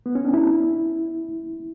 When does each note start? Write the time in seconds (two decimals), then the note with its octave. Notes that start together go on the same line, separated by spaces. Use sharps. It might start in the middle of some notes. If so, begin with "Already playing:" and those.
0.06 B3
0.15 C#4
0.25 D4
0.33 E4